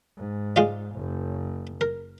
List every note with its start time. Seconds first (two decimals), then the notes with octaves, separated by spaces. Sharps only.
0.17 G#2
0.56 G#3 F4 D5
0.95 F#1
1.81 A#4